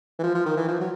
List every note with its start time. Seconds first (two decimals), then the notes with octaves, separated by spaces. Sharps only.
0.19 E3
0.23 F3
0.35 F3
0.46 D#3
0.57 E3
0.68 F3
0.80 F#3